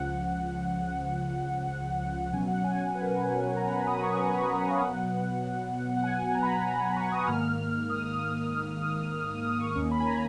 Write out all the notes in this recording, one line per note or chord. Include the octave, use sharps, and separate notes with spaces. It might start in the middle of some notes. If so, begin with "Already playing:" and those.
Already playing: C#2 C#3 F3 F#5
B2 F#3 C#4 G#5
F#5
G#5
B4
A#4
B4
C#5
A#5
B5
D#6
B5
C#6
C#6
B5
A#5
F5
B2 F#3 B3 F#5
F#5
G#5
A#5
B5
A#5
A#5
B5
C#6
C#6
D#6
G#2 D#3 A#3 F6
D#6
F6
D#6
D#6
D#6
D#6
F6
D#6
D#6
C#6
D#2 D#3 A#3 C#4 C#6
B5
G#5
A#5